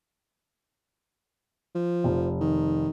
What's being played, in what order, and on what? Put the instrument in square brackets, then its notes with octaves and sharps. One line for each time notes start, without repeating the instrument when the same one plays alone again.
[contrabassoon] F3
[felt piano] F1
[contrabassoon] D#3